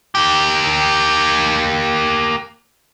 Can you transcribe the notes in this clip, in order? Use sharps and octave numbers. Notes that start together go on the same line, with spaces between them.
A#3 G4